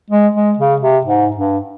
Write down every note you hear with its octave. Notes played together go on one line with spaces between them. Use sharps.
G#3
G#3
C#3
C3
G#2
G2